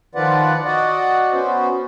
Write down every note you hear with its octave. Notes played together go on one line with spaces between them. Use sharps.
D#3 F3 F4 B4 D5 F#5
F#4 D5 D#5 F#5
B3 C#4 F#4 C5